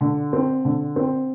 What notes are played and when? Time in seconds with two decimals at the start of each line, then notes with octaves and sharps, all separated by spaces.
0.01 D3
0.33 C4
0.65 D3
0.96 C4